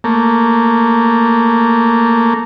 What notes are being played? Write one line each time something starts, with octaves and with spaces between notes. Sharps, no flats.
A3 A#3